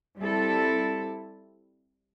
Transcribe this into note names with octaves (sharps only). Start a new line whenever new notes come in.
G3 C4 E4 A4